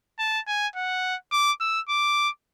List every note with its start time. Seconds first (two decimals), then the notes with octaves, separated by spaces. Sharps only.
0.19 A5
0.47 G#5
0.76 F#5
1.32 D6
1.60 E6
1.89 D6